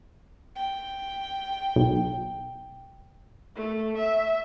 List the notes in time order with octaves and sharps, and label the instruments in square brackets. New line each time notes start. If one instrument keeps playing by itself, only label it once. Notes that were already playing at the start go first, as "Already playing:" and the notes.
[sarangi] G5
[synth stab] B1
[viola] A3
E5